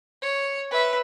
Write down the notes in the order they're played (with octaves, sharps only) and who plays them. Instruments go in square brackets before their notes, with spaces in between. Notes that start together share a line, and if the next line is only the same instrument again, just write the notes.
[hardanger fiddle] C#5
B4 E5